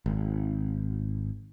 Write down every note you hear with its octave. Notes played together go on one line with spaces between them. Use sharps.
G#1